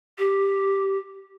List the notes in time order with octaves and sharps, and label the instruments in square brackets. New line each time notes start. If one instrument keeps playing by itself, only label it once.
[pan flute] G4